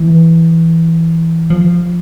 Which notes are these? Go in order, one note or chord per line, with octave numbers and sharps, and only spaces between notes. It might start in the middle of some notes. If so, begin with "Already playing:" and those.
Already playing: E3
F3